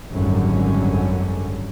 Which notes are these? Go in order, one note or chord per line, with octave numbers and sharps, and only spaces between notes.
G#1 F#2 D3 F#3 G3 C#4